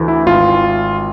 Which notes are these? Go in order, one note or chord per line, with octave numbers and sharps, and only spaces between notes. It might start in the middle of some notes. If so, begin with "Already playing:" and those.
Already playing: D2 E3
E4
G#1 F4